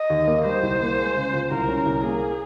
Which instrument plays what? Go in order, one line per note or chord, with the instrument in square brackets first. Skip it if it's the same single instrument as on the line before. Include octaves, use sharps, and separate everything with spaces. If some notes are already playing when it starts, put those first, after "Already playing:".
Already playing: [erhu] D#5
[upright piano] D#2
A#3
[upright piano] G3 [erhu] C5
[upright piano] C2
A#3
G#3
C#3
C#2
[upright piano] C2 [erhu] A#4
[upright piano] C#4
C2
[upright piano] A#3 [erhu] G#4